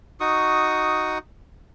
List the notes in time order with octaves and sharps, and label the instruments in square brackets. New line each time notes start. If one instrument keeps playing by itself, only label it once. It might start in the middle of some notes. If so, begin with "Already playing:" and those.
[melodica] D#4 F#4 C#6 D#6